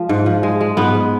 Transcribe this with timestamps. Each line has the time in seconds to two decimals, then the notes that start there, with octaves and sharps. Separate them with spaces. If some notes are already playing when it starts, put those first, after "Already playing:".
Already playing: F3 G#3
0.09 G#2
0.26 F3
0.43 G#3
0.61 G#3
0.77 G#2 B3
0.94 G#3